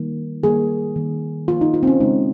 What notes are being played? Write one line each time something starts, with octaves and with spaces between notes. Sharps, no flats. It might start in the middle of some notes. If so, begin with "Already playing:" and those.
Already playing: D#3 G3 A#3
D#3 G3 A#3 G#4
D#3 A#3
D#3 A#3 F4
D#4
F4
C4
C#4
C#3 G#3 D#4